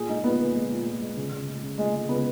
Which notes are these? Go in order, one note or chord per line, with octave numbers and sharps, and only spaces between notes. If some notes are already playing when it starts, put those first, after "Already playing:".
Already playing: A#2 G#4
G#3 D#4
A#2 B3
A#2
G#3
A#2
G#3
G#3
C#3
C#3
G#3
C#3
G#3
G#3
C#3 B3